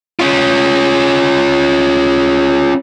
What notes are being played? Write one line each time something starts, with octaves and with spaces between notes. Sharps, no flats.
C#4 F4